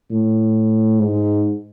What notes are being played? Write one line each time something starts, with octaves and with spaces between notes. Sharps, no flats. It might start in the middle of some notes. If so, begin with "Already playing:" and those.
A2
G#2